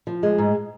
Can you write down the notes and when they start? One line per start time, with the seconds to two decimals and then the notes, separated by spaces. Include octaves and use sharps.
0.07 F3
0.23 G#3
0.38 G#2